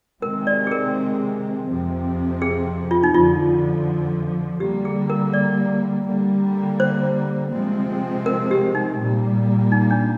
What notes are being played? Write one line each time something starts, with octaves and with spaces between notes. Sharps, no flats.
C3 D#3 G#3 C4 A#4
D5
G#4
A#4
F2 C3 F3 C4
G#4
F4
D#4
F2 D3 F3 F4
D3 G3 A#3 G4
G#4
A#4
D5
D3 G3 A#3
C5
C3 F3 G#3 C4
A#4
G4
D#4
A#2 G3 A#3
D#4
D4